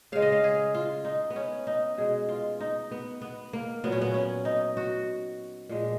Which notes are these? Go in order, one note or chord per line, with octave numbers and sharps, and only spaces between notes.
C#3 G#3 F5
D#5
F5
G#4
F4
D#4
B3
C#4
D#4
B2 G#3 G#4
F4
D#4
B3
B3
A#3
A#2 F#3 B3
C#4
B3
C#4
D#4
F#4
A#2 F3 G#3